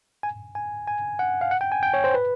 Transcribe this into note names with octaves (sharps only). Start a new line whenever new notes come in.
G#5
G#5
G#5
F#5
F5
F#5
G5
G#5
G5
C#5
C5
B4